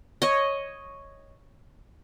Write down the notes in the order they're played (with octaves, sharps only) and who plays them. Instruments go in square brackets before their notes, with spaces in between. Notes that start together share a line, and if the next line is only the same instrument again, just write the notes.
[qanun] C#5 D#5